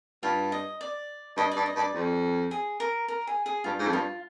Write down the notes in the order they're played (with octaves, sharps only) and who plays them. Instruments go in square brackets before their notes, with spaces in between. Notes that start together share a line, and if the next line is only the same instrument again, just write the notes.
[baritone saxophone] G2 [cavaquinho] F4
[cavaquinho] D#5
D5
[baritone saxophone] G2 [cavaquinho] D#5
[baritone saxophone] G2 [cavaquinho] D5
[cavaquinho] D#5
[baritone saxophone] G2
[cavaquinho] D5
[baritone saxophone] F2
[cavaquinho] G#4
A#4
A#4
G#4
G#4
[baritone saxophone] G2 [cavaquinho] F4
[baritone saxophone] G#2
F2
[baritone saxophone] G2 [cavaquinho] F4